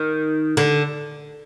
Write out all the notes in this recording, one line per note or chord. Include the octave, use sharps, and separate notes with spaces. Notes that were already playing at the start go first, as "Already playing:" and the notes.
Already playing: D#3
D3